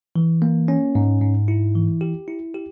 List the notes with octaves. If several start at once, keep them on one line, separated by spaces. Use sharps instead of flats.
E3
A#3
C#4
G#2
G#2
E4
E3
G4
E4
G4